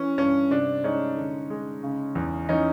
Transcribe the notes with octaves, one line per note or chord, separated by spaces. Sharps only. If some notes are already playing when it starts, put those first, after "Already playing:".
Already playing: E3 C#4
G2 C#4
C3 D4
G#3 C#4 D#4
D3
G#3
C#3
E2
E3 C#4 D#4